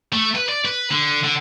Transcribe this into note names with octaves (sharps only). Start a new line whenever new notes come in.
A3
B4
D5
B4
D3
D3